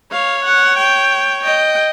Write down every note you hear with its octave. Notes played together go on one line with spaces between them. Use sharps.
C#5 F5
F#5
G5
D#5 G5